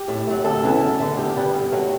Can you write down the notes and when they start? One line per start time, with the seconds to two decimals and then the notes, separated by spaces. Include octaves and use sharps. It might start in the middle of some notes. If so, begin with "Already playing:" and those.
Already playing: G4
0.08 A2
0.27 F#3 A3
0.44 D2 A4
0.63 C#3 E3 B3
0.82 F#2
1.00 D3 A3
1.17 E2 G4
1.36 D3 G3 B3
1.54 G2
1.72 F#3 A3